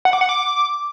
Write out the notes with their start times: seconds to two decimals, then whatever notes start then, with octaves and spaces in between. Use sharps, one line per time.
0.05 F#5
0.13 D6
0.21 F#5
0.29 D6